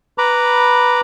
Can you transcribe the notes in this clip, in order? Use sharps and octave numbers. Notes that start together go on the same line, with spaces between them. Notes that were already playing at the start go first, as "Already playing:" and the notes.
B4 A#5 B5 D6